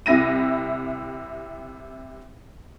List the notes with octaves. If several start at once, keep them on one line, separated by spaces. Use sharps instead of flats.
C2 C3 E4 A#6 D#7